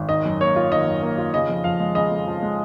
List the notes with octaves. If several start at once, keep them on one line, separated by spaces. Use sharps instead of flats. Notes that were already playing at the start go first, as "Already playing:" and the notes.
Already playing: G#1
D#3 D#5
F#2
A#3 C#5
F4
D#3 D#5
F#2
A#3
F4
C#3 D#5
F2
F3 F5
G#3
C#3 D#5
F2
F3
G#3